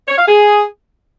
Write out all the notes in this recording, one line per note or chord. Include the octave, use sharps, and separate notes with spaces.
C#5
F5
G#4